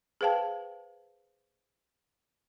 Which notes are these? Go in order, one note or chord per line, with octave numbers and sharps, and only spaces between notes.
G#4 B4 C5 F5 G5 A5